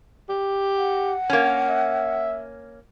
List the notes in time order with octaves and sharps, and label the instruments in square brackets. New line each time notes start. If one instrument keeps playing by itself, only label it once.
[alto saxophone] G4
[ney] F#5
[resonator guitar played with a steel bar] A#3 C#4
[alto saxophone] E5